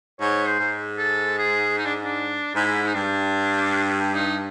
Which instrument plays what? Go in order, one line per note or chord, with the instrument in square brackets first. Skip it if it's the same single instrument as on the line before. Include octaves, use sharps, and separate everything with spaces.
[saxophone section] G#2 [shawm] C#5
[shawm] C5
[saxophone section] G#2
[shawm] A4
G#4
D#4
D4
D4
[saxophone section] G#2 [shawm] E4
[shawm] D#4
[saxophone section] G2 [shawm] D4
[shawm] D#4